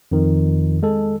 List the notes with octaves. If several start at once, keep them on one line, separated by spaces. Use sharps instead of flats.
F2 D#3
G#3 A4